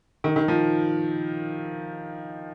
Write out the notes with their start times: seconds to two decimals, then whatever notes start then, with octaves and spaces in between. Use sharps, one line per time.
0.24 D#3
0.36 D#3
0.48 F3